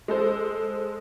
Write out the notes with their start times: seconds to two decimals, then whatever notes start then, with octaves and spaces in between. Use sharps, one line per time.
0.08 G#3 A4 C5